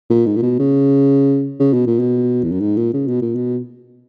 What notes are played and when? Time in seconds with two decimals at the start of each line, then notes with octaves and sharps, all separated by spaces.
0.10 A#2
0.26 G#2
0.36 A#2
0.43 B2
0.59 C#3
1.59 C#3
1.73 B2
1.87 A#2
1.99 B2
2.43 E2
2.52 F#2
2.60 G#2
2.77 A#2
2.94 C#3
3.08 B2
3.22 A#2
3.35 B2